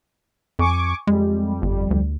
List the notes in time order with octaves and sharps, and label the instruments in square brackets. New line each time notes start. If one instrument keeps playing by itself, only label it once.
[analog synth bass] F2 [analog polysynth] G#5 C#6 D6
[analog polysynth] F2 G3 [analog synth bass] G#3
[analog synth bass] G1
D2